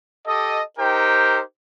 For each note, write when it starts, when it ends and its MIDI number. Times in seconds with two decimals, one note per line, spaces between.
0.27 0.61 67
0.27 0.61 69
0.27 0.61 75
0.79 1.40 63
0.79 1.40 67
0.79 1.40 70
0.79 1.40 72
0.79 1.40 79